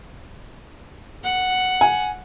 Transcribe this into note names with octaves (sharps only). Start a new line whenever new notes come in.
F#5
G#5